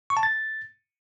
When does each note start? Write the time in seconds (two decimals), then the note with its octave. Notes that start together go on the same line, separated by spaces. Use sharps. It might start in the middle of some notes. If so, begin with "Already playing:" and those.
0.10 C#6
0.17 A5
0.23 A6